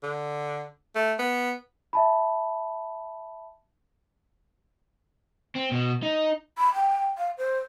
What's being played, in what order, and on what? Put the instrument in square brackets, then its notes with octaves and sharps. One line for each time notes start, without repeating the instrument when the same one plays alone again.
[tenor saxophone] D3
A3
B3
[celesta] E5 A5 B5
[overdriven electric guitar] C4
B2
D#4
[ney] B5
G5
F5
C5